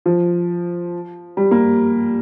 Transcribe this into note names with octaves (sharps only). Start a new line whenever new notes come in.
F3
G3
A#3